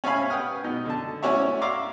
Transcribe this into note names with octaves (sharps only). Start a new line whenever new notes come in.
C#4 C#5 E5 F5 G#5 B5
B4 F#5 G5 D#6 F6
B2 D#4
D3 A5
C#4 E4 F#4 C#5 D5 E5
D5 E5 F5 A#5 C6 D6